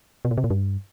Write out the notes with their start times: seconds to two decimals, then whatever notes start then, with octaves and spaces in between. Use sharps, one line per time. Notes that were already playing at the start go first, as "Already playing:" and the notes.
0.25 B2
0.31 A#2
0.38 C3
0.44 A#2
0.50 G2